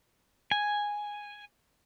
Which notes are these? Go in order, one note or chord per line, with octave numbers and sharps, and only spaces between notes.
G#5